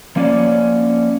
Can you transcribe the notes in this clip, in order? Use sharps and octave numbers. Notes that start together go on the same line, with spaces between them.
F3 A#3 C#4 C#5 D5